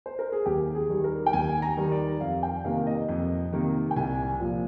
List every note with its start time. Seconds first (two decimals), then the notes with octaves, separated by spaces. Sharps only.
0.06 C5
0.19 A#4
0.32 G#4
0.46 D#2 G4
0.75 G#4
0.89 D#3 G3
1.04 A#4
1.26 G5
1.33 D#2 G#5
1.62 A#5
1.77 D#3 G3
1.92 D5
2.21 F2 F5
2.43 G5
2.65 C3 D#3 A#3 F5
2.87 D#5
3.09 F2
3.52 C3 D#3 A#3
3.91 G5
3.96 C2 G#5
4.40 A#2 F3